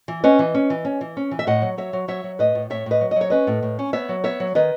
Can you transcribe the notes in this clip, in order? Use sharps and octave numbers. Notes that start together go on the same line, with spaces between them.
E3
C#4 B4 D#5
E3
C#4
E3
C#4
E3
C#4
E3
E5
A2 D#5 F#5
F#3
F#3 C#5 E5
F#3
F#3 C#5 E5
F#3
A2 B4 D#5
A2
A2 C#5 E5
A2 B4 D#5
F#3
D#5
F#3 C#5
C#4 B4 D#5
A2
A2
C#4
B3 C#5 E5
F#3
B3 C#5 E5
F#3
D#3 B4 D#5